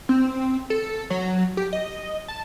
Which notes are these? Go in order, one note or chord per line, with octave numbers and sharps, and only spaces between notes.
C4
A4
F#3
G4
D#5
A5